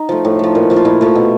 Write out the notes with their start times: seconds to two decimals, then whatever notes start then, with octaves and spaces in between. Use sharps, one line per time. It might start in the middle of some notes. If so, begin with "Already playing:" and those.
Already playing: D#4
0.09 F3 A3
0.25 A2
0.39 F3 A3
0.55 A#2
0.70 F3 A3
0.77 F4
0.85 A#2 E4
1.01 F3 A3
1.15 B2